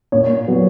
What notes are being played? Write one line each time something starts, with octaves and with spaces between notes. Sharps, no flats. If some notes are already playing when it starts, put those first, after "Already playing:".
A#2 C#5
F#3 B3